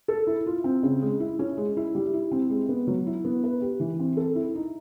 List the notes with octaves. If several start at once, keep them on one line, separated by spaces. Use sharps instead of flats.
A4
E4
F4
C4
C#3
G#3
E4
C#4
G#3
E4
G3
E4
C4
G#3
B3
F#3
E4
B3
B4
G4
E3
C4
A4
E4
D#4